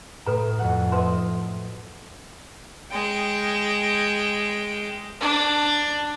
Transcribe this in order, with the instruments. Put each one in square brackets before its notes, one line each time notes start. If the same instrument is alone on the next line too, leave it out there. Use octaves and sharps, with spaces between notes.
[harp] A2 [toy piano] A4 B4 A#5
[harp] F2 F#3 F#5
[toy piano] D#4 B4 C6 [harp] D#5 E5
[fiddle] G#3 G5
[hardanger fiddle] D4